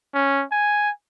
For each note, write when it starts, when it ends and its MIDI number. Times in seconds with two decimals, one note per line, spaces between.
0.14 0.44 61
0.52 0.90 80